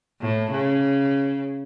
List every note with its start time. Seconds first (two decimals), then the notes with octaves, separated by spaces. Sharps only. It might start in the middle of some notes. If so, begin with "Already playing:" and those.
0.21 A2
0.51 C#3